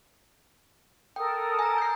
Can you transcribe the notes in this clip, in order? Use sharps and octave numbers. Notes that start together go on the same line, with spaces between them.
A4 A#4 G5 D#6
G#5 A#5
G6 C7